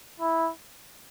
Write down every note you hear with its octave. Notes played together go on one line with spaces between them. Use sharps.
E4